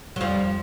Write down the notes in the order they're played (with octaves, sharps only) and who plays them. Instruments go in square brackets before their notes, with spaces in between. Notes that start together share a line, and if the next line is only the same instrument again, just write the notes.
[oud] F#3
[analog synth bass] F2 [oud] F3 G3